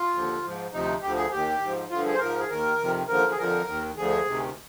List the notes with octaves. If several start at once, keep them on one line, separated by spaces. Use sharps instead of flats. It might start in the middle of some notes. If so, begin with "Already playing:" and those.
Already playing: F4
D#2 D3 F3
G#2 F3
D2 C3 F3 D#4
D2 D3 F3 G4
G#4
D#2 D#3 G4
G#2 F3
G2 D3 F3 F4
G#4
C5
G#2 F3 A#4
G#4
D#2 D#3 A#4
F2 C3 D#3
D#2 D3 F3 A#4
G#4
F2 D3 F3 A#4
D#2 D#3
D2 D3 F3 G#4
D2 C3 D#3